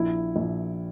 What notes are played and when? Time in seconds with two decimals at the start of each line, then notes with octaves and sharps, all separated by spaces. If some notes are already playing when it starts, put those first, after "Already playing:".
Already playing: A#1 E4
0.36 A#1